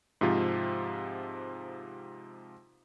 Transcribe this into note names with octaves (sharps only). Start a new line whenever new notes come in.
G#2 C3 F3 F4